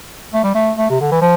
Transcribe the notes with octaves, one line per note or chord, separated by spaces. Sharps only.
A3
G3
A3
A3
C3
D3
E3
F3